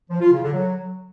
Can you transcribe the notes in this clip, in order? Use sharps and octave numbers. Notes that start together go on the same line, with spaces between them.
F3
F4
C#3
D3
F#3